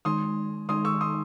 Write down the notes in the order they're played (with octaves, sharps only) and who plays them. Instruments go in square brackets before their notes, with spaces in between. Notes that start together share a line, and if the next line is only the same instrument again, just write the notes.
[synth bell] D#3 G#3 D#4 [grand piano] C6 D#6
[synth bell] D#3 G#3 D#4 [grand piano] C6 D#6
[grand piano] C#6 E6
C6 D#6